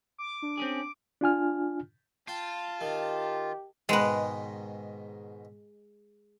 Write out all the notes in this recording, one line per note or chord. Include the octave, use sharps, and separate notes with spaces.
D6
D4
C4 C#4 G#4
D4 F4 G#5 F6
F4 G5 A5
D#3 G4
G#2 B2 D#3 G#3 B4